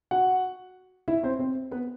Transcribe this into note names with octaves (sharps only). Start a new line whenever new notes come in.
F#4 F#5
E4 E5
C4 C5
C4 C5
B3 B4